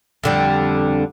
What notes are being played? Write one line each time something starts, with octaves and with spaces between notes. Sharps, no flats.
F2 D3 G3